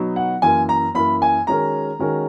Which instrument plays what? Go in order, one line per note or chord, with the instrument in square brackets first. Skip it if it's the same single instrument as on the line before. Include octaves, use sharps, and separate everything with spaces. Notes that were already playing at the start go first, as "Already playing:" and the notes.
Already playing: [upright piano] B2 F#3 B3 D#4 F#4
[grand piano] F#5
[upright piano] F#2 E3 A#3 E4 A#4 [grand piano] G#5
[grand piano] A#5
[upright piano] F#2 E3 A#3 E4 A#4 [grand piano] B5
[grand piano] G#5
[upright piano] D#3 G#3 C#4 F#4 A#4 [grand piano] A#5
[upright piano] D#3 G#3 C#4 F#4 A#4